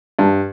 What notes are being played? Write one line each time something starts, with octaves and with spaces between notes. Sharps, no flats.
G2